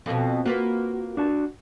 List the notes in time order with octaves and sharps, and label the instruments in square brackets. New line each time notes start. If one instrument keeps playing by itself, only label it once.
[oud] F2 B2
[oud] A#3 F4 B4 [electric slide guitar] F#4
[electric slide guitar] D4 F#4 A5